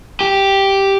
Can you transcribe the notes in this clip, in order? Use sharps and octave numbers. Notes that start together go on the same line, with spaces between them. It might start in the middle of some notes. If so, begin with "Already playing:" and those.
G4